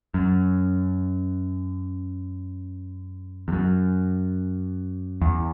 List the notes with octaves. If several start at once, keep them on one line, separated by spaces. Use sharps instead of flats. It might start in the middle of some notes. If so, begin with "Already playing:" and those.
F#2
E2
F#2
E2